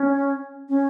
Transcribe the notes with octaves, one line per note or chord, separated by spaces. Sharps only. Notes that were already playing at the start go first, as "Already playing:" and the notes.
Already playing: C#4
C#4